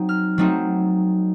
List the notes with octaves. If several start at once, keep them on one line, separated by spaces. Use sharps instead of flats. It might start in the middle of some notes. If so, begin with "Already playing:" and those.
Already playing: F#3 C4 D#4
F6
F#3 A3 C4 D#4